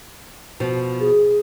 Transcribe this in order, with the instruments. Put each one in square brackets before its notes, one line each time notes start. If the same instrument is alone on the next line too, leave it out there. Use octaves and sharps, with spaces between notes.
[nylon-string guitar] B2 F3
[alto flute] G#4